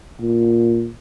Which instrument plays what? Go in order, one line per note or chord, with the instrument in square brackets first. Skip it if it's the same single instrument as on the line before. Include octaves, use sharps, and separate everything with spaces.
[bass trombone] A#2